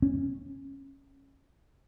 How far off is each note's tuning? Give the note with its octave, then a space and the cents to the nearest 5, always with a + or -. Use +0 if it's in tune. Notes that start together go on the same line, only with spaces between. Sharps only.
C#4 -15